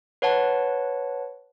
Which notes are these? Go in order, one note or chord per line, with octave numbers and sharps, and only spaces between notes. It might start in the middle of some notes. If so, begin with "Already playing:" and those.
B4 C#5 F#5 A5